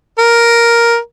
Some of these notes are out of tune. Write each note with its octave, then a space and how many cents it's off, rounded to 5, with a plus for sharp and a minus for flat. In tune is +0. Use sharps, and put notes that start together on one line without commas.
A#4 +5